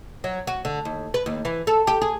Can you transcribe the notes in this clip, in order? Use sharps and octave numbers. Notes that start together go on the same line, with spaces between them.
F#3
F#4
D3
D#2
B4
D#2
E3
A4
G4
G#4